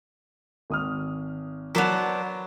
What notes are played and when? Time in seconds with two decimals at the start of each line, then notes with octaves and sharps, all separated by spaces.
0.70 G#1 D#6 F6
1.75 F#3 B3 D4 A#4 C5 B6